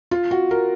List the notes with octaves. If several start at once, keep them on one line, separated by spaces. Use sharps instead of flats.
F4
F#4
A#4